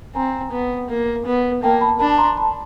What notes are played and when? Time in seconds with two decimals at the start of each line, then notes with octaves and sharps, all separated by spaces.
0.15 C4 G#5 A#5
0.52 B3
0.90 A#3
1.26 B3
1.63 A#3 G5 A5
1.81 A5 B5
2.00 D4 A5 B5
2.18 A#5 C6
2.37 A5 B5